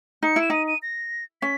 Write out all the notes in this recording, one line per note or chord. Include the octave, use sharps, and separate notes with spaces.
D#4 C#7
E4
E7
D#4 D#7
D#7
A#6
C#4 B6